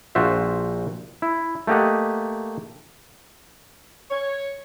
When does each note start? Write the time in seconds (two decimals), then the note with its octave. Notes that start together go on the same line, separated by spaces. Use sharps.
0.15 A#1 F4 F#4 C5 E5
1.22 E4
1.67 A3 A#3 G4 D#5 F#5
4.11 C#5